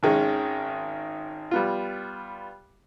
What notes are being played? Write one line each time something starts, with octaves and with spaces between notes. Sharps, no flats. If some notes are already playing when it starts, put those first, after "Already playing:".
G#1 D#3 G#3 C#4
G3 B3 F4